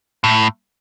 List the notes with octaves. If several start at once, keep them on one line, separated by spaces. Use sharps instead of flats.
A2